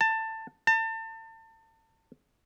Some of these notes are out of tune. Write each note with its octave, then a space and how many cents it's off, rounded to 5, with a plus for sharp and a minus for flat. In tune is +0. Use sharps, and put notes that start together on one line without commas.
A5 +20
A5 +35